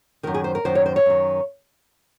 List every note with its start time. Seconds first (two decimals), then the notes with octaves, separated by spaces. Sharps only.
0.23 F#2 D#3 A#4
0.34 G#4
0.44 C5
0.55 A#4
0.65 F#2 D#3 C5
0.75 C#5
0.86 C5
0.96 C#5
1.06 F#2 D#3